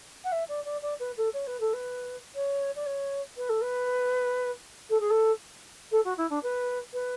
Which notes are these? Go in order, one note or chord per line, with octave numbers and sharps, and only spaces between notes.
F#5
E5
D5
D5
D5
B4
A4
C#5
B4
A4
B4
C#5
D5
C#5
B4
A4
B4
A4
G#4
A4
A4
F#4
E4
D4
B4
B4